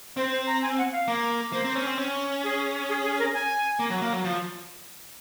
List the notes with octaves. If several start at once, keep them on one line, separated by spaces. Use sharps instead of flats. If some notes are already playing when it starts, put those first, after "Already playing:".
C4 C5
C5
A#5
G#5
F#5
F5
A#3
A#3 C5
C4
C#4
C4
C#4
G#4
G#4
G#4
A#4
G#5
A#3
F#3
A#3
F#3
F3